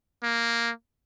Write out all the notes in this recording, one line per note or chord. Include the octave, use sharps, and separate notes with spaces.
A#3